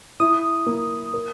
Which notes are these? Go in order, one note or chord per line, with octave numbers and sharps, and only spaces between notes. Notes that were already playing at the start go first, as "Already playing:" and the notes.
E4 D#6
A#3
A#4